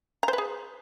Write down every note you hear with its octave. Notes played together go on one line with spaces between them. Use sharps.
A#5
C5
B4
G#4